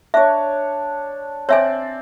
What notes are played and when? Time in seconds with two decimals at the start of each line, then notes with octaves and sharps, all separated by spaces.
0.14 D4 C#5 E5
1.49 C4 C#5 D5 E5 G#5